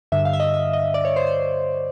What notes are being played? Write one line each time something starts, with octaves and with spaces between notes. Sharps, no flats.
G2 D3 E5
F5
E5
D#5
E5
D#5
D5
C#5
C5
C5